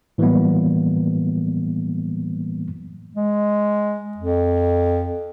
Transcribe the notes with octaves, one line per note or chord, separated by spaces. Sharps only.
A2 E3 F#3 G3 A#3 B3
G#3
F2